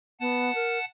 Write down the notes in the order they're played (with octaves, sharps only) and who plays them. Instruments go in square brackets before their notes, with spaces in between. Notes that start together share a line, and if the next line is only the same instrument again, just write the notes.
[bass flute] B3 [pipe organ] F#5 A5
[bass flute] A#4